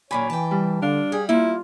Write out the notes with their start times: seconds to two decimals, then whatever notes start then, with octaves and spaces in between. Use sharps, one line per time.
0.11 F#2 A#2 D#3 C#5 G#5 B5 D6
0.30 E3 G5 A5
0.51 G3
0.82 D3 D4 F5
1.12 G3 G#4
1.29 A#3 E4 F4